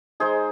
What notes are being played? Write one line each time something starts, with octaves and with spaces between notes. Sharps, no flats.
G#3 D#4 G#4 C5